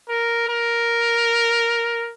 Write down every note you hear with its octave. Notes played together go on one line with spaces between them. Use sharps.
A#4
A#4